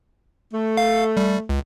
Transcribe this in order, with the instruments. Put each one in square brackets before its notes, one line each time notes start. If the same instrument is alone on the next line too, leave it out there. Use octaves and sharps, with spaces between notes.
[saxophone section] A3
[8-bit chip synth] F5
G3
C#2